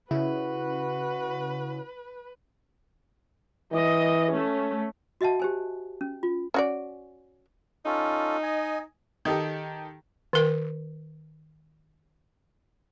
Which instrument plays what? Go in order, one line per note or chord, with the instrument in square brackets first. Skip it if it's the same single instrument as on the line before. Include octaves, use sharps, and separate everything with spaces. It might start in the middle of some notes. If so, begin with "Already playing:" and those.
[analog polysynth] C#3 [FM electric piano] E4 [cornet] F#4 [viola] B4
[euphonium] E3 [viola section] D#5
[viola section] A3 C#4
[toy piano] F#4 D#5 E5 F#5 A5
G4 C5 G#5
C#4
F4
[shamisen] C#4 F#4 D5
[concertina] C#4 F4 A4 [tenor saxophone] D#4
[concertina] D#5 G#5
[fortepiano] D#3 D#4 G4 A4
[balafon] D#3 A#4